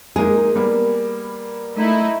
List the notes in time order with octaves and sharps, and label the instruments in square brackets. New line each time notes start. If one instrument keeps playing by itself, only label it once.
[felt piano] G#3 A#3 D#4 [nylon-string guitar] G#4
[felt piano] G3 A#3 B3
[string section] A3 D#4 E4